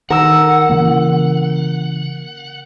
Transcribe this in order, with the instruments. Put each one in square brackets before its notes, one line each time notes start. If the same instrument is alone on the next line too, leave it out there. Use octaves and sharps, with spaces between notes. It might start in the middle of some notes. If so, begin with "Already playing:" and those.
[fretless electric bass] D#3 [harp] A#4 E6 [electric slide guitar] F#5
[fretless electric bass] C#3 E3 A#3